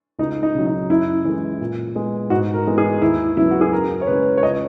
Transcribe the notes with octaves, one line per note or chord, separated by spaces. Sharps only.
C#2 D#4
D#4
C#3 F#3
D#4
F#2 E4
E3 G#3
A#2
G#3 B3
G#2 F#4
A#4
E3 G#3 B3
G#4
D#2 E4
C#3 F#3 B3 E4
F#4
G#4
F#2 A#4
C#5
C#3 G#3 B4
C#5
C#2 D#5